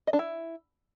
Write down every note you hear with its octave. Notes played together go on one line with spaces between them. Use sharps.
D#5
D4
E4